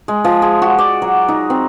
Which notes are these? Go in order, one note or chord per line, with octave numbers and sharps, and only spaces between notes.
G#3
F3
G#4
F#4
D5
F#3
D#4
C4